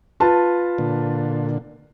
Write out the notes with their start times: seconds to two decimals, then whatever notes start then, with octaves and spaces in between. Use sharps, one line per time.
0.20 F4 B4 A5
0.78 A#2 D3